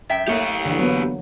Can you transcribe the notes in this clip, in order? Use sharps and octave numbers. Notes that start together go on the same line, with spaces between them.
F#2 E5 G5
A3 A#3 G4 C#5
D3 E3
F#3 A#3 B3